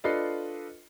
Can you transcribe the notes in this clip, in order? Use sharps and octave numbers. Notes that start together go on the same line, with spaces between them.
D4 F4 A4 B4 D#5 C7